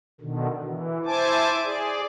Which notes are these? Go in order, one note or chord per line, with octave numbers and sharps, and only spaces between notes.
B2 D3 D#3
E3
E4 C5 G#5 A5 D6
G#4 D5